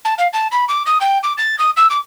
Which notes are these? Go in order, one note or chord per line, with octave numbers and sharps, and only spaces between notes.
A5
F5
A5
B5
D6
D#6
G5
D6
A6
D#6
E6
D6